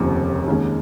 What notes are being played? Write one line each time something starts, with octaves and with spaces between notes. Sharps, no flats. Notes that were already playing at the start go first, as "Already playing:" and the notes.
Already playing: F1 D#2 C#3 F3 C4
D#2 D#3 G#3 C#4